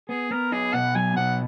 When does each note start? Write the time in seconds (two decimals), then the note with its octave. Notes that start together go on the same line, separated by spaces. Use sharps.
0.09 B3 G#4
0.31 B3 A#4
0.52 D#4 G#4
0.74 B2 F#5
0.95 F#3 G#5
1.16 B2 F#5